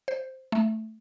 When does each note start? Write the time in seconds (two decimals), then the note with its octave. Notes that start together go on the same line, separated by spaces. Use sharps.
0.08 C5
0.52 A3